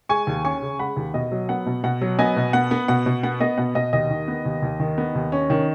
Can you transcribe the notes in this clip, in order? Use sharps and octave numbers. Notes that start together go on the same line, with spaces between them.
G#3 G#5 C#6
D#2
C#4 G#5 C#6
C#3
G#3 F#5 B5
D#2
B2 D#5
F#3
B3 F#5
B2
B2 F#5
F#3
B3 D#5 G#5
B2
B3 F#5
B3
B2 F#5
B2
B3 F#5
B3 D#5
B2 F#5
B2 D#5
D#2 D#5
D#3
B3
D#2
D#2
D#3
B3
D#2
C#4
D#3